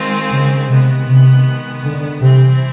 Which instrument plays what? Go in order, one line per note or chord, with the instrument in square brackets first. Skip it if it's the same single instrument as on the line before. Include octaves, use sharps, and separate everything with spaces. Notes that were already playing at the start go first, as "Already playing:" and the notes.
Already playing: [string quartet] D#3 G#3 C4 F4
[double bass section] C#3
[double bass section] C3 [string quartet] D#3 G#3 B3
[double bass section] C3
D3
[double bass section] C3 [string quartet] E3 G3 C4 E4